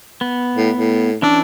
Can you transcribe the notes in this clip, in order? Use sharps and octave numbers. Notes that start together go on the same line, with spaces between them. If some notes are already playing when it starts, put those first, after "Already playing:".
B3
A2
A2
E3 C#4 D4 E6